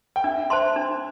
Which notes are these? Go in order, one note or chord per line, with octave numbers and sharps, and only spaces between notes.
G5
D4 E5
C5 E5 A5 C6
D4